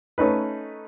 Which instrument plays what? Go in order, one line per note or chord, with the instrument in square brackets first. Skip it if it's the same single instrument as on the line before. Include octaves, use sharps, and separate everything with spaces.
[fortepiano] A3 C#4 D#4 B4